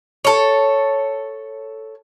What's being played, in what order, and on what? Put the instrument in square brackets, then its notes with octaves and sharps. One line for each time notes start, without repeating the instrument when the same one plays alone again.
[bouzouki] A4 C#5